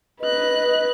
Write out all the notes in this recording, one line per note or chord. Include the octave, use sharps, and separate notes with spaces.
B4 D#5 F#6